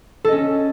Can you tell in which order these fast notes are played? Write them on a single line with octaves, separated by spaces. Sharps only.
A4 D#5 C#4